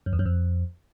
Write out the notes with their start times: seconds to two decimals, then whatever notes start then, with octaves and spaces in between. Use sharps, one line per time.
0.06 F#2
0.13 E2
0.19 F#2
0.26 F2